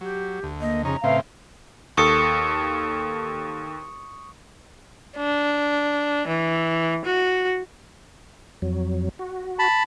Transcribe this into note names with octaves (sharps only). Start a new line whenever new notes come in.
F#3 G4
D2
A#3 D#5
F2 C#3 C#4 D#4 A#5
A2 C#3 C4 B4 E5 F5
D#2 A4 C#6 D#6 C#7
D4
E3
F#4
F2 F#3
F#4
A5 B5